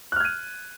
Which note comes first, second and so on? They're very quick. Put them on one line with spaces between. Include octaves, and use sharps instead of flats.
F#6 F6 G#6 D#7